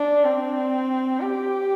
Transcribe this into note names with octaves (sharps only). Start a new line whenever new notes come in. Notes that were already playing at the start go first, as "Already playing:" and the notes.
Already playing: D4
C4
G4